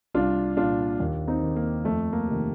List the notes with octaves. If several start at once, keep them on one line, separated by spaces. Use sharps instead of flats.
C2 D4 F4
A#2 D4 F4
D#2
C4 D#4
D#3
A#3
F2 A3
A#3
C3 D#3